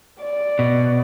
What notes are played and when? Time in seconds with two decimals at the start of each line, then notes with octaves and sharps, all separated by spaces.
0.21 D5
0.59 B2